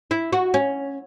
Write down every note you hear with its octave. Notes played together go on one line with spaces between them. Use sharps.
E4
F#4
C#4